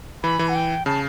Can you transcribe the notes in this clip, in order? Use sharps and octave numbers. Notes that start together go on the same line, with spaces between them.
E3 B5
E3
F#5
G5
C#3 A5